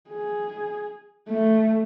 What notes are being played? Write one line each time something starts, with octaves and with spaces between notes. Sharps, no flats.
G#4
A3